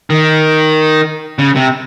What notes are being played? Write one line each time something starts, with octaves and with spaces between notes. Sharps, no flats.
D#3
C#3
C3